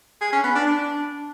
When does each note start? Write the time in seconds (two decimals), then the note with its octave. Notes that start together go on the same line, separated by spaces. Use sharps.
0.21 G#4
0.33 C#4
0.44 B3
0.55 D4
0.67 D4